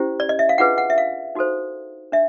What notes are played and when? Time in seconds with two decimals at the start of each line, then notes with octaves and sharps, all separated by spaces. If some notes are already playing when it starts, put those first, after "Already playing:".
Already playing: C#4 E4 G4 C5
0.20 D5
0.29 D#5
0.39 E5
0.49 F5
0.58 D4 F4 G#4 B4 F#5
0.78 F#5
0.90 E5
0.98 F5
1.35 D#4 F#4 A4 C5
2.12 D4 E5